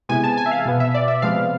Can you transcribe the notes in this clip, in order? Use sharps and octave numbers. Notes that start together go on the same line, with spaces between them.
C3 E3 G#3 B3 G#5
A5
G#5
E5
F5
B2 B3
E5
D5
E5
C3 F3 G#3 B3 F5